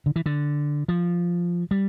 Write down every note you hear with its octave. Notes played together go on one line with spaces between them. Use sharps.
D3
E3
D3
F3
G3